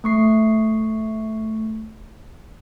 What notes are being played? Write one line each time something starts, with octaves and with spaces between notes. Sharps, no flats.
A3 C#6 C7